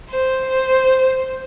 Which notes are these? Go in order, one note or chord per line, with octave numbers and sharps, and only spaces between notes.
C5